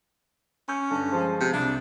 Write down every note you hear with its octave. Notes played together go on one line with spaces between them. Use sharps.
C#4 C#6 G6
G2 D3
F3 G#3 C5
C3
C2 D4